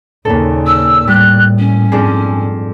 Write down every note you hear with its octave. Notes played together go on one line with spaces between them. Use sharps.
D#2 A#2 C#3 A4
E6
A2 G3 F#6
C#4
F2 G#2 D4 G#4